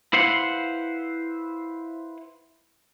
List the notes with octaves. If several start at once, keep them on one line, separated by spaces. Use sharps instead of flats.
E4 B4 C5 F5 F#5